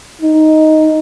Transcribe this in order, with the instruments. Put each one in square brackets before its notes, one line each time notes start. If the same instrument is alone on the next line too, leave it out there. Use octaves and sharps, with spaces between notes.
[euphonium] D#4